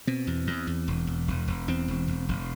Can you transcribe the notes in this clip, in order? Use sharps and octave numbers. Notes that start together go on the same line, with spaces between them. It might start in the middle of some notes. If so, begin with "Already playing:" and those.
B2 C4
E2
E2
E2
E1
E2
E1
E1
E2 C4
E1
E1
E1